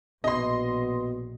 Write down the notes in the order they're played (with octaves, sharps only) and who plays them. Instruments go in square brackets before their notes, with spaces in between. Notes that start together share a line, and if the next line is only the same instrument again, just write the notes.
[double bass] A#1 [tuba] B2 [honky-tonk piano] D#5 C6